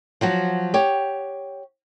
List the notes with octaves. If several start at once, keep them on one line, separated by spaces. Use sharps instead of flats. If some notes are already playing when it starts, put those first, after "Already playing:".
F3 F#3 F#4
G4 C#5